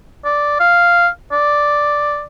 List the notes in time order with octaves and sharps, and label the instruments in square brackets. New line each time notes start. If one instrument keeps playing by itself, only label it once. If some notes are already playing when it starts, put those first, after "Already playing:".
[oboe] D5
F5
D5